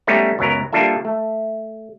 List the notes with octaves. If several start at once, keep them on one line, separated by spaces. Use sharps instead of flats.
G3 A3 B3 C#4 D#4
C#2 F#2 F#3 B3 A#4 A#5
G3 A#3 D4 F4 A4 E5
A3